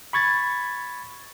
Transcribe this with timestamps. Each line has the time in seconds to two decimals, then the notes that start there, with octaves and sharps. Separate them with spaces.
0.13 B5 C#6 G#6 A6